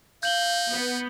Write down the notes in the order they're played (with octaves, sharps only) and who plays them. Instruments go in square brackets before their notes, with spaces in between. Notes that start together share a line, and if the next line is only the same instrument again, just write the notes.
[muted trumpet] D#4 [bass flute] F5 [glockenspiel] G6 F#7 G7
[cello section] B3